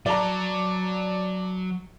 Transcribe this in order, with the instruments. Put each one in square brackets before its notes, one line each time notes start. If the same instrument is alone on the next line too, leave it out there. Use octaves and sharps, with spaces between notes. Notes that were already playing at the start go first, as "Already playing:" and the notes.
[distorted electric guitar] F#3 [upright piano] D5 A5 A#5